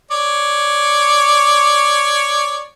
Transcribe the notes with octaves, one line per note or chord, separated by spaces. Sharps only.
C#5 D5